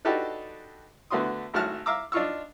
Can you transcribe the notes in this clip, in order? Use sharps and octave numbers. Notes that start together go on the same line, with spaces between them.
D4 D#4 F#4 G4 A4 B4
D3 A3 B3 F#4 C6 D#6
G#1 A3 F#4 F#5 A5 F6
E5 F5 A#5 D6 E6
D4 D#4 F4 C#6 E6